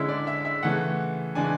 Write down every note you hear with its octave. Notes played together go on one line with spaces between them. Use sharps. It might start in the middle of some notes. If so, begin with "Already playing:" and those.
Already playing: D3 G#3 C#4 E4 E5
D5
E5
E5
C#3 E3 A3 F#5
C#3 E3 G#3 D4 G#5